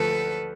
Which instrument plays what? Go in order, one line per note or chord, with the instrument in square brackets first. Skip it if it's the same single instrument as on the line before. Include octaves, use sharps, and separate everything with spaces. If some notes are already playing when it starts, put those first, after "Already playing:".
Already playing: [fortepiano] D2 F3 [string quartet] A4 B4